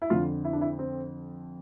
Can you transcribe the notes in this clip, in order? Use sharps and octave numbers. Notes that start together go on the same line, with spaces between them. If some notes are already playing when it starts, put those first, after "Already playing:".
E4
F2 D3 F4
E4
D4
E4
C4